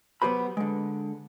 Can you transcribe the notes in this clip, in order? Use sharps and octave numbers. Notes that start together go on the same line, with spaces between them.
F#3 B3 G4 C5 B5
D3 G#3